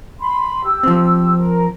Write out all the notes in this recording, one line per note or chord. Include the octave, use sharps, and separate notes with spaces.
B5 C6
G4 E6
F3 C4
A#4